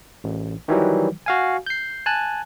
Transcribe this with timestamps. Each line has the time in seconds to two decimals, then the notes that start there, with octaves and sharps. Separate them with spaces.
0.24 A1
0.68 D#3 E3 F#3 G3
1.26 F#4 F5 G#5
1.66 G6 C7
2.06 G#5 A5 F#6